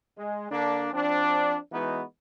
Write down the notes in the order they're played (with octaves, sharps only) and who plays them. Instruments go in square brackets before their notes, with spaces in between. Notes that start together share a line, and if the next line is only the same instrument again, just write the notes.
[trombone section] G#3
D3 A#3 D4
F3 C4 D4
E3 G#3 B3 D#4 F#4